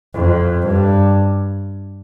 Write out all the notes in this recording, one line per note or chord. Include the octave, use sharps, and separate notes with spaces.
F2
G2